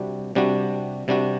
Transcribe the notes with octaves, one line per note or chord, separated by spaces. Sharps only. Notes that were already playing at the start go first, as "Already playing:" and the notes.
Already playing: C3 G3 D4 F#4
C3 G3 D4 F#4
C3 G3 D4 F#4